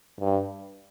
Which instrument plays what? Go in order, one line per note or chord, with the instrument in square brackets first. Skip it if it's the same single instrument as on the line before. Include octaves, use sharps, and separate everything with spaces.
[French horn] G2